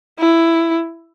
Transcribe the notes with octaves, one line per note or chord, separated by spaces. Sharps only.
E4